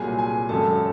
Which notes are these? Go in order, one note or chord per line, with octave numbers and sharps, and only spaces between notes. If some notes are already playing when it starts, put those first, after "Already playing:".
Already playing: C2 A#2 F#3 G#4 G#5
G#4 G#5
G#1 F#2 C#3 A4 A5